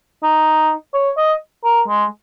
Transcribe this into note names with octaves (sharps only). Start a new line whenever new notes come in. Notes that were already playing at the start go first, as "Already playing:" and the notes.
D#4
C#5
D#5
A#4
G#3